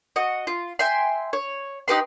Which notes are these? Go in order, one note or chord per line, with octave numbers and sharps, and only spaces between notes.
F#4 D#5
F4
E5 G5 G#5 C6
C#5
D#4 G4 B4 C6